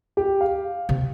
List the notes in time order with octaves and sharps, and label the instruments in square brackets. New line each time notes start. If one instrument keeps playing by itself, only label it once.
[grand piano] G4
F5
[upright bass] C3